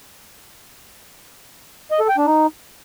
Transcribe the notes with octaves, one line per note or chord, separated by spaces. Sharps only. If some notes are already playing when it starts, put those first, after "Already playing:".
D#5
A4
G5
D4
D#4